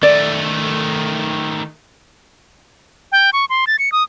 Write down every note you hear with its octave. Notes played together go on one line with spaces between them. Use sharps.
D#3 A3 D5
G5
C#6
C6
A6
C#7
D#6